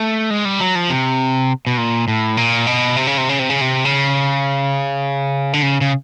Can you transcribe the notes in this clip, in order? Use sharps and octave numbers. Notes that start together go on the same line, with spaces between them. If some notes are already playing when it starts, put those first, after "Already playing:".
Already playing: A3
G#3
G3
F#3
F3
C3
B2
A#2
A2
A#2
B2
C3
C#3
C3
C#3
C3
C#3
C3
C#3
D3
C#3
C#3